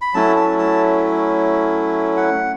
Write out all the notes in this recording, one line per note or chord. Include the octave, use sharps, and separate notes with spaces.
B5
F#3 A3 C#4 E4 A5
A5
A5
F#5